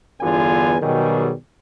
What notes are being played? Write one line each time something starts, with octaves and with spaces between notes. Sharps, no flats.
G1 E2 D3 B3 F4 G#5
B2 D#3 F#3 G3 G#4